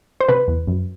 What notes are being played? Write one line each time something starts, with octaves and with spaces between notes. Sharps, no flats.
C5
C3 B4
E2
F#2